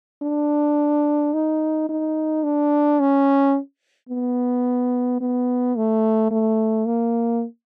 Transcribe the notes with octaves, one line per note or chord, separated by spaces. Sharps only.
D4
D#4
D#4
D4
C#4
B3
B3
A3
A3
A#3